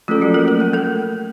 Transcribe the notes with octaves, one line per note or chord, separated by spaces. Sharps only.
F3 A3 C#4 F4 A4
F#3 F#4
A#3 A#4
A#3 A#4
A#3 A#4
A3 A4